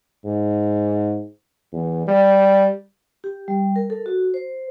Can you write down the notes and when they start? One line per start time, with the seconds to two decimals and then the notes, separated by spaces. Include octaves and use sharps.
0.25 G#2
1.73 E2
2.07 G3
3.24 G4
3.48 G3
3.76 A#4
3.90 A4
4.06 F#4
4.34 C5